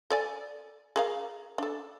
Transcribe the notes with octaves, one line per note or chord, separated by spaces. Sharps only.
A4 D5 G#5
G#4 A#4 F5
D4 A4